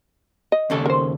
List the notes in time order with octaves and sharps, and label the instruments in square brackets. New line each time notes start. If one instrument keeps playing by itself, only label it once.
[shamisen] D#5
[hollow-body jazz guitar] D#2 C#3 A4
[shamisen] A#4 C5